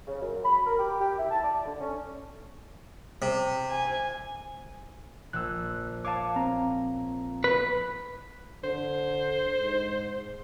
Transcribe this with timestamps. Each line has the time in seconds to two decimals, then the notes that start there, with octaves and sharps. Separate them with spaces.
0.07 C#3
0.22 F#2
0.45 B5
0.66 A#4
0.79 G4
1.00 G4
1.18 E4
1.31 A5
1.44 D5
1.66 D3
1.81 C#4
3.22 C3
3.71 G#5
5.33 A#1 E6 F#6
6.05 C#5 F5 A5 D6 D#7
6.36 C4 A#5
7.44 B3 B4
8.64 D3 C5
9.61 G#2